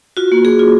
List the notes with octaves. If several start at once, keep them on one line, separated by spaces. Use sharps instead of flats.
F4 F#4
A#3
A#3 G#4
F4